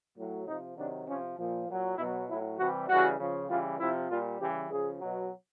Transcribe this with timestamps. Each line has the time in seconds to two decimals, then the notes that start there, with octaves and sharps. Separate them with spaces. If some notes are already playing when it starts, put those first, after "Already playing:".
0.18 A2 F#3
0.47 C3 F3 D#4
0.77 C3 D#3 F#3 D4
1.08 C3 F3 C#4
1.38 A#2 F3
1.68 A#2 F#3
1.98 B2 F#3 E4
2.28 A2 F#3 E4
2.59 C3 E3 G3 F#4
2.88 C#3 E3 G3 F#4
3.20 C#3 F3
3.49 C#3 E3 G3 F4
3.79 C3 F3 E4
4.10 A#2 G3 F4
4.40 C#3 E3 G3 G4
4.70 C#3 F3 G#4
5.01 B2 F#3